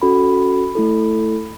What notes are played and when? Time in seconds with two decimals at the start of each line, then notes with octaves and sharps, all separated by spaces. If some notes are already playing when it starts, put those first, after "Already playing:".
0.02 C#4 F#4 A4 B5
0.75 A3 E4 A4